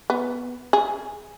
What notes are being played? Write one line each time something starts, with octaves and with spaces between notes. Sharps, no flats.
B3
G#4